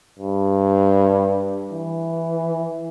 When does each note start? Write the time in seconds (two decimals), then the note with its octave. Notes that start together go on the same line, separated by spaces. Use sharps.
0.19 G2
1.73 E3